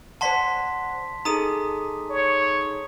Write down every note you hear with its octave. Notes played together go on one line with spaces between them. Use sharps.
C5 D5 F#5 A5 C6 B6
D#4 G#4 A4 A#5 D#6 D#7
C#5